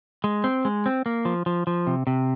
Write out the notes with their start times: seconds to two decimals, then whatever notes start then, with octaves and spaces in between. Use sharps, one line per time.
0.24 G#3
0.44 C4
0.65 G#3
0.86 C4
1.06 A#3
1.25 F3
1.46 F3
1.67 F3
1.87 C3
2.07 C3